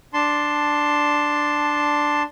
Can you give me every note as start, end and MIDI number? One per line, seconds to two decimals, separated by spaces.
0.14 2.23 62
0.14 2.23 81
0.14 2.23 84